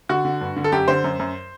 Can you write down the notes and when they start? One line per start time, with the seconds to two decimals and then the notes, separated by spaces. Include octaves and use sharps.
0.09 D3 F#4
0.25 D3
0.41 G2
0.56 D3
0.64 A4
0.72 F#2 G4
0.88 D3 C5
1.04 F#2
1.19 F#2